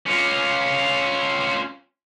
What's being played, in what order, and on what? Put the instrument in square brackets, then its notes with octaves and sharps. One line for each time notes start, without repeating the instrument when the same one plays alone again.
[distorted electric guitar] C#4 F4